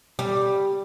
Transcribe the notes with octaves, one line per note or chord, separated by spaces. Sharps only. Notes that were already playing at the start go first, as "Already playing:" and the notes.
G3